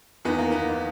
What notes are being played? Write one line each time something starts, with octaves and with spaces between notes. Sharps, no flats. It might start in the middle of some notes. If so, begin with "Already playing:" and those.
E2 D#3 B3
A#3
B3
D#3